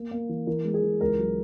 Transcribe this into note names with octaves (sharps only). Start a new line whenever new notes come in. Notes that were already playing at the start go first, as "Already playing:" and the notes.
Already playing: A#3
A#3
E3
E3 A#4
G#3
G#4
E3
C#2 A#4
F#3